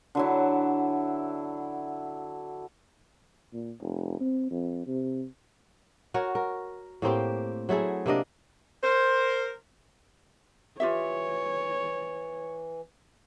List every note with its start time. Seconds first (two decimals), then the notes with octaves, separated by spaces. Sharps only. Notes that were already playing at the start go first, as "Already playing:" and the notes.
0.15 D3 F#3 E4
3.53 A#2
3.81 F1
4.20 C4
4.51 F2
4.87 C3
6.14 F#4 A#4 C#5
6.35 A#4
7.02 A2 A#3 C4 G4
7.69 F#3 A3 E4 G#4
8.06 C3 A#3 D4 D#5
8.83 A#4 C5
10.80 E3 F4 G4 C#5 E5